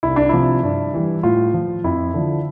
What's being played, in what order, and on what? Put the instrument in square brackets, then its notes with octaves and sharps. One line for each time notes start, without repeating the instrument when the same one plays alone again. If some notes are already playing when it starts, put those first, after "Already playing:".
[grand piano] C2 E4
D4
C3 F3 E4
G2
E3 G3
A2 F4
F3
F2 E4
D3 F3